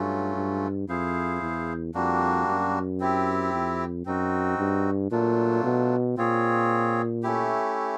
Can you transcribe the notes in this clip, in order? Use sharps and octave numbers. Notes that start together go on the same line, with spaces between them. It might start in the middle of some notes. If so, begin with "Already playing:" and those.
Already playing: G2 F#3 A3 C#4 F4
G2
F2 E4 G#4 C5 F5
E2
F2 G3 A#3 D4 F#4
F#2
C4 E4 G4
F2
F#2 C4 D#4 F#4
G2
A#2 F#3 A3 D4 F4
B2
A#2 C4 F4 G#4 C#5
A3 C#4 E4 G4